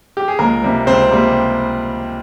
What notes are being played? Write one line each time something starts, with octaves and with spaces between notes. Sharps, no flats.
G4
G#4
C#2 A#3 A#4
C3 G3 A#3
C#2 C4 C5
C3 G3 A#3